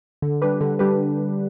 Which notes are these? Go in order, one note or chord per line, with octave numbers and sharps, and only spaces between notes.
D3
G3 D4 G4 B4
D3
G3 D4 G4 B4